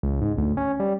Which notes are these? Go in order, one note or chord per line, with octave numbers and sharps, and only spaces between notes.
C#2
G#2
D2
C#4
G3